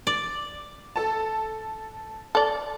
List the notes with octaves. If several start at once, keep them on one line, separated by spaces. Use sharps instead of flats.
D5
A4 A5
A4 D5